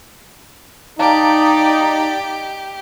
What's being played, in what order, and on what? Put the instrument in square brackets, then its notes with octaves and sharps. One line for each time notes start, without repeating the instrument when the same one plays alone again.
[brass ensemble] D#4 [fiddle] G4 [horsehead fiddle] D5 [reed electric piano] F5 A5 A#5